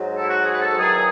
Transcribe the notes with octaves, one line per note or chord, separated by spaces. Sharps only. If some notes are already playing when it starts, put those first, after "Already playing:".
Already playing: G#2 F#3
A4
E4
F#4
G#4
B4
A4
E2 D#3 F#3 G#4